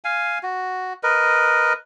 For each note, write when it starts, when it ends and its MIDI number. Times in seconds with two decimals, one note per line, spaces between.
0.04 0.39 77
0.04 0.39 80
0.43 0.93 66
1.03 1.73 70
1.03 1.73 71
1.03 1.73 75